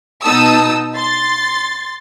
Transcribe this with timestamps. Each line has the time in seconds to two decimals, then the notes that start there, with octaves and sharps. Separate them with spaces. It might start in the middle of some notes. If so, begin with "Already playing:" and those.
0.23 B2 B3 D#4 A5 D#6 E6
0.94 C6 A6